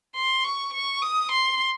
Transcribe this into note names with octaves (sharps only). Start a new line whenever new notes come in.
C6
C#6
C#6
D#6
C6